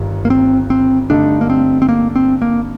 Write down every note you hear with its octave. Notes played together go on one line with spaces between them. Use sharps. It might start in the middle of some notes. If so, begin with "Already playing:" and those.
Already playing: G1 G2 D#3
A#3
C4
C4
G2 D3 A3 D4 D#4 A4
A#3
C4
C4
A#3
C4
A#3